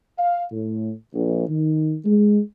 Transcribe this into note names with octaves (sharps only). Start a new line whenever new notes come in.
F5
A2
A#1
D#3
G#3